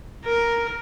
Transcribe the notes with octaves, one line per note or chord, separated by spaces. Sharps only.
A#4